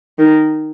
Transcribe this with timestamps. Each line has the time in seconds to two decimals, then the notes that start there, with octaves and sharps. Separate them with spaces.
0.19 D#3